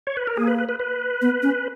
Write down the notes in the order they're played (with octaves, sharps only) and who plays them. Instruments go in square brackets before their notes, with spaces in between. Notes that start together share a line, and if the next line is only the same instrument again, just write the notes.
[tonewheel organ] C#5
B4
A#4
[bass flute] A#3 [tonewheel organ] G#4
[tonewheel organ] B4
B4
B4
B4
[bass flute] B3
C#4